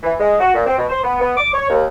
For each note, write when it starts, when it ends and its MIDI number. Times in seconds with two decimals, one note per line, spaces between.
0.03 0.14 52
0.19 0.38 56
0.40 0.53 66
0.54 0.65 46
0.66 0.77 60
0.78 0.85 47
0.89 1.02 72
1.03 1.19 59
1.20 1.33 59
1.37 1.53 86
1.53 1.69 73
1.70 1.85 39